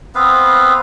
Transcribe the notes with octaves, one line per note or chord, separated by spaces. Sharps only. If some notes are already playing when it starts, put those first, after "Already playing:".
B3 C4 B4 F5